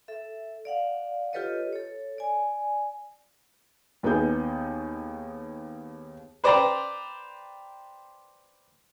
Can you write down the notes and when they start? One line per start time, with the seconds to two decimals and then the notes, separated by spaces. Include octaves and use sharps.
0.08 A4 E5
0.65 D5 F5 F#5
1.33 F4 G4 A4 B4 C#5 D#5
1.73 A4 C#5
2.18 D5 G#5
4.03 D#2 B3 D#4 G#4 G6
6.44 B4 C5 D5 G5 A#5